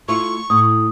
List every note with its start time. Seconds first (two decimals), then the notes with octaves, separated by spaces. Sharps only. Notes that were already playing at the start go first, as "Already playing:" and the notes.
0.08 A3 E4 F4 C#6
0.50 A2 D#6